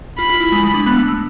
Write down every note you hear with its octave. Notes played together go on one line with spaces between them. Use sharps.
F4 B5
F4
E4
G#3
G#3
D4
B3
A3
A3